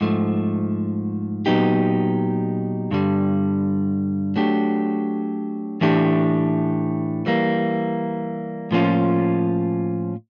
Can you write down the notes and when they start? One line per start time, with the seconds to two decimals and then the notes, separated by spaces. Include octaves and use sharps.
0.01 G#2 F3 A3
1.46 A#2 F#3 B3 D#4 G4
2.91 G2 D3 G3
4.36 F#3 A3 D4 G4
5.81 A2 E3 A3 D4 G4
7.26 E3 G3 A#3
8.71 A2 F3 A#3 C#4 F4